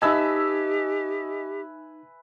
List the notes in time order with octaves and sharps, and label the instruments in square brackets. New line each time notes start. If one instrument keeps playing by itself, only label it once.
[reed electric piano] D#4 A5 [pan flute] G4 [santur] B4 E5 G#5 [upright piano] D#5 E6